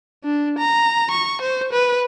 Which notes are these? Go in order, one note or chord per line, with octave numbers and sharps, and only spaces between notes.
D4
A#5
C#6
C5
B4